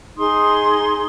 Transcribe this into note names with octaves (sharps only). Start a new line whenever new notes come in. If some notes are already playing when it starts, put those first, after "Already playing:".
D#4 G#4 C6 D#6